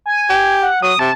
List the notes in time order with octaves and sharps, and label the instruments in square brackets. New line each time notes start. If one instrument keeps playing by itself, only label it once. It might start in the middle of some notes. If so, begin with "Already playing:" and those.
[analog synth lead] G#5
[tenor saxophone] G4
[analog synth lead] F#5
[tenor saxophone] F#3 [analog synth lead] D#6
[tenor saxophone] C3 [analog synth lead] A5